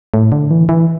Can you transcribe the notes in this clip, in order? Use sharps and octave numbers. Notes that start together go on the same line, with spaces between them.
A2
D3
E3
E3